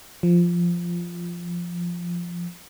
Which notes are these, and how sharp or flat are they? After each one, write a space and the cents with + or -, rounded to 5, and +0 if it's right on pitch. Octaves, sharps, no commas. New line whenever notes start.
F3 -5